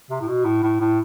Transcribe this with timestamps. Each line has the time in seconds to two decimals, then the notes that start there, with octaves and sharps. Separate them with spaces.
0.11 C3
0.21 A2
0.28 B2
0.45 A2
0.63 A2
0.80 A2